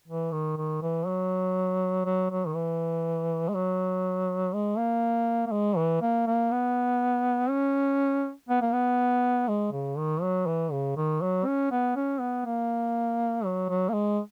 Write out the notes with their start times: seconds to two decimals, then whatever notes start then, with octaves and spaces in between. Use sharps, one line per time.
0.08 E3
0.32 D#3
0.57 D#3
0.82 E3
1.07 F#3
2.05 F#3
2.31 F#3
2.47 D#3
2.55 E3
3.49 G#3
3.54 F#3
4.53 G#3
4.78 A#3
5.47 A#3
5.52 G#3
5.77 E3
6.01 A#3
6.27 A#3
6.51 B3
7.50 C#4
8.49 B3
8.61 A#3
8.73 B3
9.48 G#3
9.73 C#3
9.98 D#3
10.22 F#3
10.47 E3
10.72 C#3
10.97 D#3
11.22 F#3
11.46 C#4
11.72 B3
11.96 C#4
12.20 B3
12.46 A#3
13.45 F#3
13.69 F#3
13.89 A#3
13.94 G#3